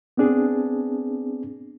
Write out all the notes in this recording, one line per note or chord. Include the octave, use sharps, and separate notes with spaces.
B3 C4 D4 G#4